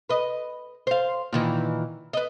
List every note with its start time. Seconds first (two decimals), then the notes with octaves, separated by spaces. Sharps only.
0.10 B4 D#5
0.87 C5 F5
1.33 A#2 D#3 E3
2.13 B4 D#5